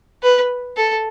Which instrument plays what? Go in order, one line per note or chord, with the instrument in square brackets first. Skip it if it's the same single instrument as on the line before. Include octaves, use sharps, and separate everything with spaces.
[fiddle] B4
A4